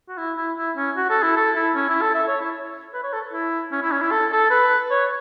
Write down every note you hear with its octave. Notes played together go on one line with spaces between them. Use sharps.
F#4
E4
E4
E4
C#4
F#4
A4
E4
A4
E4
C#4
E4
A4
E5
C#5
E4
B4
C#5
A4
E4
C#4
E4
C#4
E4
A4
A4
B4
C#5